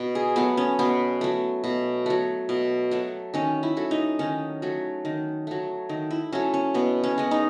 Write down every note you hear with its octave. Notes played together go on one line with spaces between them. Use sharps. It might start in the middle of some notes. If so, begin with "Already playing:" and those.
Already playing: B2
G#4
F#3 A3 B3
C#4
B2 B3
F#3 A3
B2
F#3 A3
B2
F#3 A3
D#3 C#4
E4
F#3 A3
D#4
D#3 C#4
F#3 A3
D#3
F#3 A3
D#3
E4
F#3 A3 C#4
C#4
B2 B3
C#4
G#3 B3
D#4